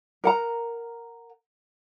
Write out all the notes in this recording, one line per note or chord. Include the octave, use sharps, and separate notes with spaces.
A#4 F#5 A#5